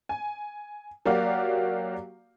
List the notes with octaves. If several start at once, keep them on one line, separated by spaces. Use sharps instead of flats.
G#5
F#3 A#3 F#4 G4 D5 F5